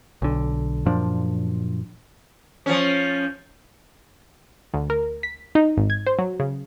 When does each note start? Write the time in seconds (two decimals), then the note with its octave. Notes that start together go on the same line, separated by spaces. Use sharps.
0.22 B1 D3
0.86 F#2 A#2 F3 D4
2.66 F3 C#4
4.74 D2
4.90 A#4
5.23 B6
5.55 D#4
5.77 G#1
5.90 G#6
6.07 C5
6.19 F#3
6.40 C#3